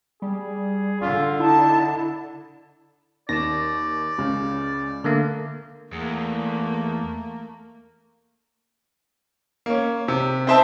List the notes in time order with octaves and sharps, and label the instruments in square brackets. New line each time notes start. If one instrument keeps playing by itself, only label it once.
[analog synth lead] G3 [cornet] G#4
[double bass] D3 [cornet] F4
[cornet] D#4 [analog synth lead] E4 [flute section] A5
[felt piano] D#2 E7 [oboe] D5 [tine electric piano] A#6
[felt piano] C#2 C#3
[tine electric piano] D3 A3 A#3
[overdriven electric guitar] E2 [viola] A3 A#3
[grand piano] A#3 C#4
C3
C4 D#4 C5 E5 A5